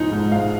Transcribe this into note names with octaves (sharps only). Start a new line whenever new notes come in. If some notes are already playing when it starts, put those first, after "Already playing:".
Already playing: G#2 F3 G#3 D#4
G#2
G#2 F5